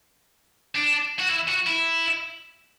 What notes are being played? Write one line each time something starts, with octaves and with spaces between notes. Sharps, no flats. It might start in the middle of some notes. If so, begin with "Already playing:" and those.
D4
F#4
E4
F#4
E4